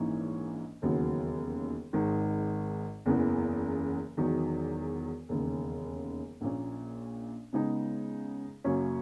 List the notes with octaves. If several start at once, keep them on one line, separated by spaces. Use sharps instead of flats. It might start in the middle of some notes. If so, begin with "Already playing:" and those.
Already playing: A#1 G#2 E3 A#3 C#4
E1 D#2 C#3 F#3 B3
G#1 G#2 D#3 G#3
F#1 E2 C#3 E3 B3
E1 E2 D#3 F#3
E1 D#2 C#3
A#1 A#2 A#3 C#4
C#3 G#3 B3 D#4 G#4
F#2 C#3 F#3 A#3 C#4